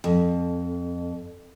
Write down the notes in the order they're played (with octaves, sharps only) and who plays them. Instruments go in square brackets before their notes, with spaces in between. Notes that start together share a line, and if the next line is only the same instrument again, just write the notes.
[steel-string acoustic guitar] F2